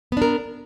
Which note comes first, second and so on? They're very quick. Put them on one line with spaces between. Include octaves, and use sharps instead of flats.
B3 D4 A#4